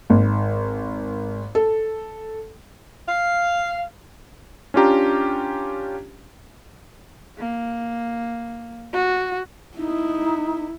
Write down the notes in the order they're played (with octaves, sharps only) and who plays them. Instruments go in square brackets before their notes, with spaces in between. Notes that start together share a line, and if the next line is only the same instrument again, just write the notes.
[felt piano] G#1
A4
[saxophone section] F5
[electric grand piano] C#4 D4 F4 G4 A#5
[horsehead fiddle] A#3
F#4
[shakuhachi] D#4 [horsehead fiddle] E4